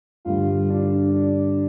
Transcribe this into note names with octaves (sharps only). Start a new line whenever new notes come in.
G2 D3 G3 F4
D4
D4